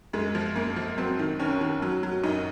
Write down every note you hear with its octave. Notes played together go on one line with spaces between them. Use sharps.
F#2 G#3
F3
F#2 A#3
F3
F#3 C4
D#3
D#2 C#4
D#3
F#3
F#3
F#2 D#4